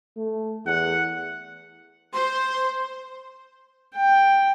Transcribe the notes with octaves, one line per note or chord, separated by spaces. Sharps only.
A3
E2 F#5
C5 C6
G5